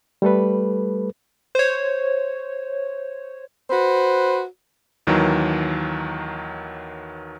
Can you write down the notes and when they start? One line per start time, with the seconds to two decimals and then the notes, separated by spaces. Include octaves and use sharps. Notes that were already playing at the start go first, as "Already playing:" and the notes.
0.22 G3 A3 A4 B4
1.55 C5 C#5
3.70 F#4 B4 C5
5.07 D#2 D#3 E3 F#3